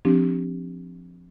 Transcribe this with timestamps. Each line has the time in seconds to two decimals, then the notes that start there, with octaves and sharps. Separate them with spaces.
0.05 F3 C4 D4 G4